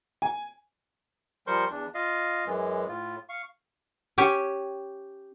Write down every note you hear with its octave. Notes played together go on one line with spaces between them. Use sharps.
G#5
F3 G3 A#4 C5 C6 C#6
E2 D4
F4 D#5 F5
F#2 E3 G#3
A2 F4
F5 C#6
C#4 G4 G#5